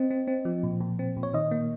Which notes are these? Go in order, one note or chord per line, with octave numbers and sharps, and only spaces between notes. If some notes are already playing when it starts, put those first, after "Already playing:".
Already playing: C4 D#5
C4
C4
F3
A#2
A#2
C4
A#2
C#5
D#3 D#5
A#3